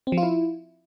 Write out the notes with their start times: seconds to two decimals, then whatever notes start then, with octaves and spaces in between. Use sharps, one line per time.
0.07 C4
0.12 F3
0.18 F4
0.23 E4